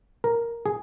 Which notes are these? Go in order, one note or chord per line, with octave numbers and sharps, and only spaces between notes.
A#4
G#4